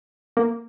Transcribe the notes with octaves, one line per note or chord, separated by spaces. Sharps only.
A#3